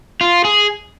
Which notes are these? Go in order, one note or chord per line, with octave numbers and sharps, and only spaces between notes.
F4
G#4